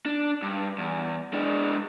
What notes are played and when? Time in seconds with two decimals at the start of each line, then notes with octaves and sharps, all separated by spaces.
0.05 D4
0.42 G2
0.78 E2
1.34 G#3 D4